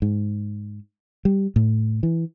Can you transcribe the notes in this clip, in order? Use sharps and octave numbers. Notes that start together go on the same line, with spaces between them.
G#2
G3
A2
E3